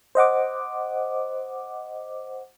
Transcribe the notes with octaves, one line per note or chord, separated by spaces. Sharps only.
C5 D#5 F#5 D6